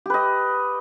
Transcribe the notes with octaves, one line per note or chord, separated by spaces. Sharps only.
G4 B4 D#5